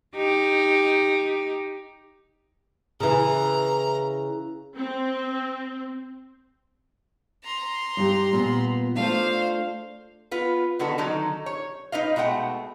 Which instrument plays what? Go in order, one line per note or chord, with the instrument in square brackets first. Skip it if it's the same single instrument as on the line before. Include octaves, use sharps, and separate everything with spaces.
[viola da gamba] D#4 G4
[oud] C#3 E3 [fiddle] A#5
[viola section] C4
[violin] A#5 C6
[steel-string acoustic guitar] G2 G4
A#2 B3
[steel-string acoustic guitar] A3 D4 F4 [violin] C5 F5
[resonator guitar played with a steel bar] B3 F4 B4
D3 D#3 B3 F#4 A4
D3 D#3 F#3 D#4 A4
C#5
D#4 B4 D#5 F5
B2 G#3 A3 F#5 G5